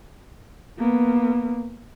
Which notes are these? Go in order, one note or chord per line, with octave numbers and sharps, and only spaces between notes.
A#3 B3